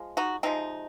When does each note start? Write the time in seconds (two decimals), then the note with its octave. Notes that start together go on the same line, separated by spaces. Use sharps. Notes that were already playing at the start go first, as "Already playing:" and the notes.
Already playing: F3 G#3
0.17 D#4 F#4
0.43 C3 F3 G#3 C4 D#4